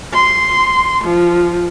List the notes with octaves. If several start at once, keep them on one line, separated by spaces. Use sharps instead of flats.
C6
F3